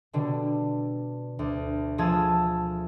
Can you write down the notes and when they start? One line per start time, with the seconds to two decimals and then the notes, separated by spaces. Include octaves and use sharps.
0.13 B2 D3 G3
1.39 D2
1.98 F3 A3 G#4 A5 E6 G#6